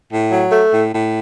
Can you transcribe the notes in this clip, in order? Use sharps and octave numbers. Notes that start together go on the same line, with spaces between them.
A2
F#3
A3
A2
A2